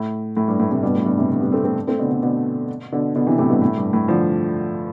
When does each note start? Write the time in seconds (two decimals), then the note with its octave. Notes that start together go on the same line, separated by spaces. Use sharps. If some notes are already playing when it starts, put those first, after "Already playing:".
Already playing: A2
0.37 A2
0.48 G2
0.60 A2
0.71 A2 C3
0.83 G2 B2
0.95 A2
1.06 G2 B2
1.18 A2 C3
1.29 B2 D3
1.41 G3 B3
1.52 A3 C4
1.64 A3 C4
1.87 A3 C4
1.99 B2 D3
2.10 B2 D3
2.22 B2 D3
2.92 B2 D3
3.15 B2 D3
3.27 C3 E3
3.38 A2 C3
3.50 G2 B2
3.62 A2
3.77 G2
3.93 A2
4.08 D3 F3